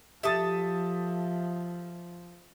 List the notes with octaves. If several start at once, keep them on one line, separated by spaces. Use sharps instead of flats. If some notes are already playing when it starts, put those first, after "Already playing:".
F3 G4 A4 E5 A5 D#6 A6